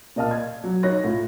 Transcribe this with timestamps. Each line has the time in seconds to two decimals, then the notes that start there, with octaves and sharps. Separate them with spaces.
0.16 A#2 D5 D#5 F5 A5 F6
0.31 G#6
0.64 F#3
0.83 D#4 C#5 F#6 A#6
1.04 A2 F4